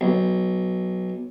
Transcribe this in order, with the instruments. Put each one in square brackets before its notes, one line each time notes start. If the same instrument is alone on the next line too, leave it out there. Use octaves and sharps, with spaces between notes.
[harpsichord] B1